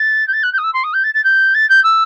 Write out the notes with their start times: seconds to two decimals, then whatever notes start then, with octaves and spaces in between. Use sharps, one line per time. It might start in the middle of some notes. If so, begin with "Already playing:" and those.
Already playing: A6
0.28 G6
0.33 A6
0.43 F#6
0.53 G6
0.58 D#6
0.64 E6
0.74 C6
0.84 D#6
0.94 G6
1.04 A6
1.14 A6
1.24 G6
1.54 A6
1.69 G6
1.84 E6